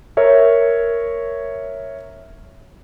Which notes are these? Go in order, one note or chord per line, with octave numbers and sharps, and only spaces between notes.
A#4 C#5 E5